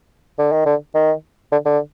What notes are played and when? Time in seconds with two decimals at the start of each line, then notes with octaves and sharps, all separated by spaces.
0.39 D3
0.52 D#3
0.65 D3
0.95 D#3
1.52 D3
1.65 D3